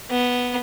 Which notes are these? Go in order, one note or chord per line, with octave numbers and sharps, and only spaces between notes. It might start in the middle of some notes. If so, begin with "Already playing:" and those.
B3